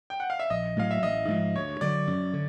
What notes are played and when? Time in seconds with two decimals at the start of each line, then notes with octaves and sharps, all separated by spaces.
0.10 G5
0.20 F#5
0.30 F5
0.39 E5
0.50 A#1 D#5
0.76 A2 F#3 A3 F5
0.91 E5
1.02 A1 D#5
1.28 G#2 F3
1.54 D2 C#5
1.81 D3 F#3 D5
2.07 F#2
2.33 D3